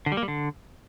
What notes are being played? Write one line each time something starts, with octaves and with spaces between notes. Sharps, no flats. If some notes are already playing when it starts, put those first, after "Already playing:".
D3
G3
A#3
G3
D3